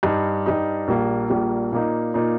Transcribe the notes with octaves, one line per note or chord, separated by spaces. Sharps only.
G2 G3 D#4
G2 G3 D#4
A#1 A#2 G3 A#3
A#1 A#2 G3 A#3
A#2 A#3 D#4
A#2 A#3 D#4